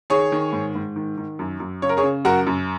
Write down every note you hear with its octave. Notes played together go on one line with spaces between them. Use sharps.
D#3 G#4 C#5
D#3
G#2
G#2
D#3
D#3
F#2
F#2
C#3 C#5
A#4
G#4 C#5
C#3
F#2 F#4 A#4
F#2